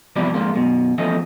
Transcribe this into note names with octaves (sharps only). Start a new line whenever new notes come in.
E2 G2 C3 F3 E4 D5
F2 G#2 A#3 F4
F#2 B2
E2 F3 A3 C4 C#4 D#5